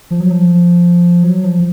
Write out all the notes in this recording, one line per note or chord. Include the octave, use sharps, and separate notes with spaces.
F3
F#3
F3
F#3
F3